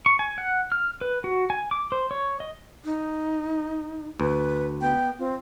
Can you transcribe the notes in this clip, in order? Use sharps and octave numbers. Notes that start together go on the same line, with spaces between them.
C#6
G#5
F#5
F6
B4
F#4
G#5
D6
C5
C#5
D#5
D#4
D2 B4
B3 G5
C4 F4